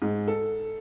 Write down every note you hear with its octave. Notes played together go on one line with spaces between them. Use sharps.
G#2
A4